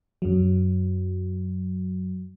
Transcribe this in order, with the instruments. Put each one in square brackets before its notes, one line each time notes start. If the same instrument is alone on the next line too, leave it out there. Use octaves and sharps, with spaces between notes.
[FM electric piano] F#2 F#3